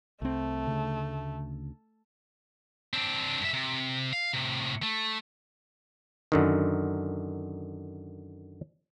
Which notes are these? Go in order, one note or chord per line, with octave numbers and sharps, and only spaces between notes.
C2 A3 C4
D2 C#3
C4 D4
G2 E5
C3
F5
A2 C3
A3
F#2 D3 D#3